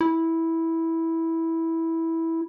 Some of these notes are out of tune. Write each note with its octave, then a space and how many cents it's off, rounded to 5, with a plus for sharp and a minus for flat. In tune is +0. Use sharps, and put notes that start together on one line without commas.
E4 -10